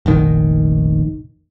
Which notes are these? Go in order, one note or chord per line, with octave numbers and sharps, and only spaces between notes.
F1 A#1 D#3